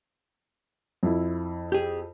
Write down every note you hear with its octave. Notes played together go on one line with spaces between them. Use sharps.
F2 E4
G4 G#4